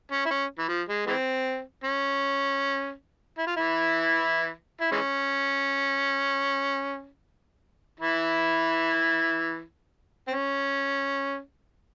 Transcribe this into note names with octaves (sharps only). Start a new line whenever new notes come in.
C#4
E4
C#4
E3
F3
G#3
E3 G#3 C4
C#4
E4
F4
E3 E4
E4
E3 G#3 C#4
E3 E4
C4
C#4